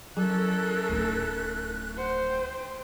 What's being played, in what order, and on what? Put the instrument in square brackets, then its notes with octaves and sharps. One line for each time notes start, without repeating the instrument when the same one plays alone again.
[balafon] F#3 [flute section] C#4 E4 F#6 [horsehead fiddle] A4 A#4
[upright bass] D1 D#4
[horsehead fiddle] C5 [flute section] F#5
[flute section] G5